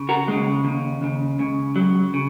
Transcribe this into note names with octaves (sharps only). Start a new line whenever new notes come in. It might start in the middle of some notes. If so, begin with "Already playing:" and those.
Already playing: C#3
F#4 A#4
D#2 C#3 G#3
D#2 C#3
D#2 C#3
C#2 C#3
C#2 C#3 F#3
C#3